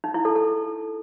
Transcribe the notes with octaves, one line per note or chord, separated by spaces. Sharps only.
D#4
E4
A4
A4